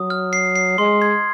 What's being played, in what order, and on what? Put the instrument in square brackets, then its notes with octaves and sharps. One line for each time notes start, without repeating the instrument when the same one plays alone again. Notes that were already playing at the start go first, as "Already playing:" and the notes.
Already playing: [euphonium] F#3 [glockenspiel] D#6
[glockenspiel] F6
C7
C7
[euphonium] G#3 [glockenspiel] C6
[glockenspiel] G#6